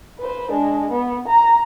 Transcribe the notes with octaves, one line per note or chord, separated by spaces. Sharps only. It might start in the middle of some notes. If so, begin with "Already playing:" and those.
B4 C5
G#3 D4
B3
A#5